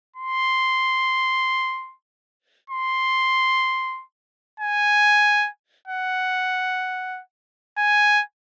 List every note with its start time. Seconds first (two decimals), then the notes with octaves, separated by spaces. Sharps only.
0.17 C6
2.70 C6
4.60 G#5
5.88 F#5
7.78 G#5